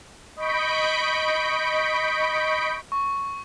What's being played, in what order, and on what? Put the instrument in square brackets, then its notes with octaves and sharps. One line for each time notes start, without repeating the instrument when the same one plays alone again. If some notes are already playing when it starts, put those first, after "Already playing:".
[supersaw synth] D#5 B5 C#6 G6 B6 D7
[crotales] C#6